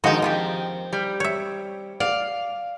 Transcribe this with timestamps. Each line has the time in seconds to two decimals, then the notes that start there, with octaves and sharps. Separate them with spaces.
0.04 F2 D3 D#3 F3 G#3 D#4 F#4 C5
0.22 F3 C4 F4 G4
0.93 G3
1.20 C#5 E5
2.00 D5 F5